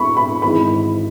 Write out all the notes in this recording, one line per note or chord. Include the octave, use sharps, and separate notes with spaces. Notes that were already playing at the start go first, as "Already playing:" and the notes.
Already playing: E1 B5 C#6
B5
G#1 G#2 E3 B5